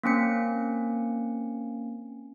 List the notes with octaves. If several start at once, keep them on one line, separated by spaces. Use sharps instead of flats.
A#3 C4 C#4 C#7